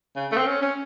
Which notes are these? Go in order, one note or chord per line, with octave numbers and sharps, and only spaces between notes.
C#3
A3
C4
C#4
C#4